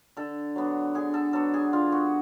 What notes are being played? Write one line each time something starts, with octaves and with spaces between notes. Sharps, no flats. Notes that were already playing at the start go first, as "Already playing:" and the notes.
D3 A4
F#3 B3 D4
D3 G#4
A4
F#3 B3 D4 A4
G#4
D3 F4
F#4